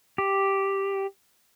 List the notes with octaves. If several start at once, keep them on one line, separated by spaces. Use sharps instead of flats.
G4